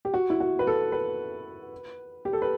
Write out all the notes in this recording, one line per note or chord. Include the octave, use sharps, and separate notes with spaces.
G4
F#4
E4
F#4
B4
A4
B4
G4
A4
B4